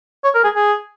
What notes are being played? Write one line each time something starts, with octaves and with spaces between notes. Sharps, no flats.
C#5
A#4
G#4
G#4